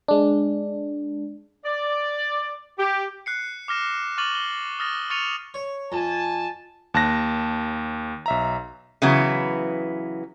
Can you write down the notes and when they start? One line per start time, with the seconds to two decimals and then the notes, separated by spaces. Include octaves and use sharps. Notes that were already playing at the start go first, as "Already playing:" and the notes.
0.08 G#3 D4
1.65 D5
2.79 G4
3.26 F#6 C7 C#7
3.68 D6 F6 A#6 E7
4.18 C#6 D6 F6 A6 D#7 F#7
4.35 G7
4.79 D#6 F6 A6 A#6
5.10 C#6 F6 A6 C#7 D#7 F7
5.54 C#5
5.92 F2 G#5 A5
6.94 D#2 A5 F#6 A#6
8.26 B1 E5 A#5
9.02 C#3 E3 F#3 B3 E4